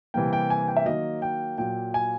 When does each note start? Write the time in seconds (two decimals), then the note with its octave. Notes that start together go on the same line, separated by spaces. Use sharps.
0.14 C3 E3 G3 A#3 G5
0.33 G5
0.50 G#5
0.68 G5
0.76 E5
0.85 D#3 F#3 A#3 D#5
1.22 G5
1.58 A#2 F#3 A#3 G5
1.94 G#5